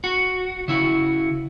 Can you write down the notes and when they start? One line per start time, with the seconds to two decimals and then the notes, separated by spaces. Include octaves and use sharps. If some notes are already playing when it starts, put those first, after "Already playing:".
0.04 F#4
0.68 C#3 E4 F#4